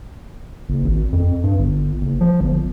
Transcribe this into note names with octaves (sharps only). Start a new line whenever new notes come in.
F#1
G#1
F2
G2
G1
F#1
F3
G1